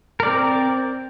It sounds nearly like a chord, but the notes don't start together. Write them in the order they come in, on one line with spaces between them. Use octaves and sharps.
A#4 D5 C4